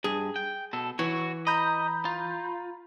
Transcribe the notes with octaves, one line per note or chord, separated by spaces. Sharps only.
G2 G#4
G5
B2 A4
E3 F#4 C#5
D#5 A#5 B5 G6
F4